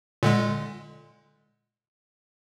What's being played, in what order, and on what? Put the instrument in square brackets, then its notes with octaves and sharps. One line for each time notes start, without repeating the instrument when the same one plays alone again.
[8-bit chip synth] A#2 D3 G#3